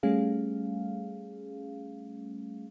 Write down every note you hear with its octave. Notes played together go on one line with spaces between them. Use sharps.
G3 A3 C#4 G#4 F5